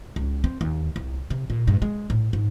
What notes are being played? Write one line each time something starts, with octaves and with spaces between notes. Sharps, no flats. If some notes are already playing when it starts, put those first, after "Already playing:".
C#2
C4
D#2
C2
C3
A#2
G2
G#3
A2
G#2